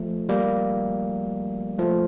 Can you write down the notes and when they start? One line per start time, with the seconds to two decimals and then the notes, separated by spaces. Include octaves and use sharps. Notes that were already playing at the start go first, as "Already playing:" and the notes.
Already playing: F3 A3
0.29 G3 A#3
1.78 F3 A3